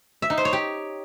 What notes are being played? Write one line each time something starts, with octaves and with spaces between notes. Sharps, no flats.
E5
D#4
C5
C#5
G4